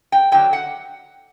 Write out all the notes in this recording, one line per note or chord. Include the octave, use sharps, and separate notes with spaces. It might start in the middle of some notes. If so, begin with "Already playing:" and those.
G5
D3 F#3 G5
F#5